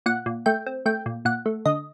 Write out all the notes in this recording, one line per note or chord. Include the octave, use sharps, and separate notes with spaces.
A#2 F#5
A#2
A3 G5
C4
A3 G5
A#2
A#2 F#5
A3
D3 D#5